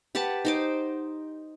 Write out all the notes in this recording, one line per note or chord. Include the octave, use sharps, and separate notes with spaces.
G4 B4 F#5 A5
D#4 C5 D6